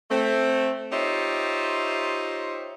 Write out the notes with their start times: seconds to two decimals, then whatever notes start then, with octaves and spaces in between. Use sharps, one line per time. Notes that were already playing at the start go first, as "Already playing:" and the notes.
0.10 A3 C4
0.92 D#4 F4 G4 C5 C#5 E5